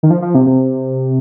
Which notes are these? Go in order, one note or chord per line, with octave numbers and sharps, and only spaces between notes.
D#3
F3
F3
C3
C3